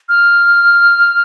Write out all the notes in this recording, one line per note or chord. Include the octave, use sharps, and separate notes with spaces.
F6